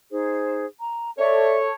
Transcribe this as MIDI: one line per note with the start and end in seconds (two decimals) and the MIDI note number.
0.10 0.65 63
0.10 0.65 68
0.10 0.65 72
0.79 1.11 82
1.18 1.74 69
1.18 1.74 73
1.18 1.57 74
1.18 1.57 76